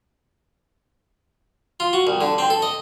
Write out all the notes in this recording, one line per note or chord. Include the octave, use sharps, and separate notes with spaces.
F4
F#4
C2
D3
C4
A4
D#5